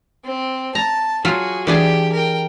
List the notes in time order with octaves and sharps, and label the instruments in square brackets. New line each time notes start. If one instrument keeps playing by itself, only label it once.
[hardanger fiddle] C4
[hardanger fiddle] A5 [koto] A#5
[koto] F#3 F4 [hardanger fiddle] F#4 G#4
[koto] E3 D4 G#4 [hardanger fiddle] G4
[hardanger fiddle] A#4 G5